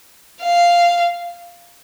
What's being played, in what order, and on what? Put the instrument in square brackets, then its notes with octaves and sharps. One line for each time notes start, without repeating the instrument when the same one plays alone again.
[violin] F5